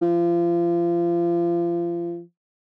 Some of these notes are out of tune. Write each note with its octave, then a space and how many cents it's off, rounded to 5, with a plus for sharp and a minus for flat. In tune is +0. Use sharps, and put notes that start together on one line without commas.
F3 -30